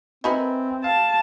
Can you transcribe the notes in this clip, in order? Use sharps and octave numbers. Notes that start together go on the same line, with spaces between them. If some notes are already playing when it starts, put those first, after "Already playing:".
C4 D#4 A#4 B4 E5 G#5 B5
F5 A5